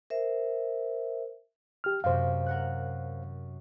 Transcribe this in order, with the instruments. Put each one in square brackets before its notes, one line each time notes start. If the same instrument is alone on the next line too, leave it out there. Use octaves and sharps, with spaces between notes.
[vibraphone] A#4 C5 E5
[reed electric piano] G4 F6
[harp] F#2 C3 [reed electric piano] C5 F5
[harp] A#4 F#5 F#6